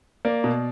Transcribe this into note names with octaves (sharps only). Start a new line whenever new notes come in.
A#3 D5
B2